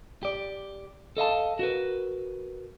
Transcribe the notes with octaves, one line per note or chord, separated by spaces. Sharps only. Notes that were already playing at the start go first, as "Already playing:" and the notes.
G4 D5
A4 D#5 F5 A5
F#4 A#4 B4